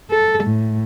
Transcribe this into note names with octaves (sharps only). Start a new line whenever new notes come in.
A4
A2